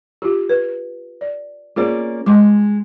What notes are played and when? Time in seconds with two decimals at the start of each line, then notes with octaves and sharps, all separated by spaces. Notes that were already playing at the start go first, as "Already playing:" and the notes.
0.22 F4 G4
0.49 B4
1.21 D5
1.76 A#3 C#4 F4 G#4 C5 D5
2.26 G#3 A5 C6 D6